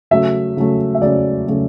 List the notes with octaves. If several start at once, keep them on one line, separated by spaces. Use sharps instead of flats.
C#3 F#3 A3 E5
C#3 F#3 A3
E5
C#3 F#3 A3 D5
C#3 F#3 A3